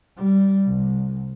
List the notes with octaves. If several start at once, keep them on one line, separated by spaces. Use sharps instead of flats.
G3
C2